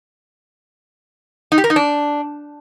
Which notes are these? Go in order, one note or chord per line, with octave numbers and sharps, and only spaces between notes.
D#4
G4
A#4
D#4
D4